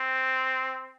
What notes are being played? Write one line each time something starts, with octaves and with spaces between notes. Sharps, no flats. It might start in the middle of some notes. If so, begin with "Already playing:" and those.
Already playing: C4